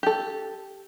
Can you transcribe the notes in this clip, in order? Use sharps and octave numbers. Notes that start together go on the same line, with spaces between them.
G4 A4